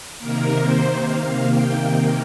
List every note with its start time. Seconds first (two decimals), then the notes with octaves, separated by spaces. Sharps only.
0.19 C3 D#3 A#3 A#4
0.63 C5
1.06 F5
1.50 G5